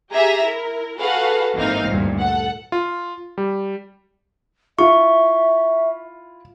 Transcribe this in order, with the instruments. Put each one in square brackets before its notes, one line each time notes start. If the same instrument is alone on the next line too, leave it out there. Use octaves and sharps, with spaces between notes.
[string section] G4 G#4 E5 A#5
E4 A#4
F#4 G#4 A4 B4 F5 F#5
G#1 E3 A#3 C4 D#4 F5
D2 G2 A#2
A4 F#5
[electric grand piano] F4
G3
[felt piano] E4 F4 [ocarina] E5 [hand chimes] C#6